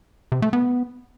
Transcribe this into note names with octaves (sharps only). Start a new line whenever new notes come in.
C3
A3
B3